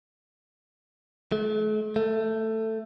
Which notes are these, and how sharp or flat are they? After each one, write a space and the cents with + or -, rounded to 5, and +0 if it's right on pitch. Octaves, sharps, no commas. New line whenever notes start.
A3 -45
A3 +10